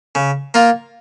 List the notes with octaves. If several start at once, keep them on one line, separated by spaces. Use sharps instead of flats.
C#3
A#3 F4